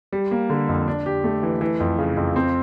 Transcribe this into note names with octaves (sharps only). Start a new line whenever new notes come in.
G3
A#3
D3
F2
D4
G4
A3
E3
E3
F2
C#3
F2
C4